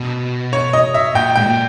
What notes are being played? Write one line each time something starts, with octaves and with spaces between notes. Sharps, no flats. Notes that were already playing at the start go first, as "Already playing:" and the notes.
Already playing: B2
C#5
D#5
E5
A#2 G5
G#2 G5
A#2